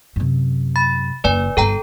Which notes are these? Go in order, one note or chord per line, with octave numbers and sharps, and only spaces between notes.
F#2 C3
B5 A6
F#1 D#2 B4 D5 G#5
G1 G2 A4 G5 A#5